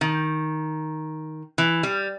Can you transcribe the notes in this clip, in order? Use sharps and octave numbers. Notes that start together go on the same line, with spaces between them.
D#3
E3
G3